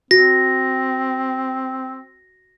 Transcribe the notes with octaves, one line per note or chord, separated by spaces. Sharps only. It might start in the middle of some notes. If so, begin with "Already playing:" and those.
C4 F#4 A#6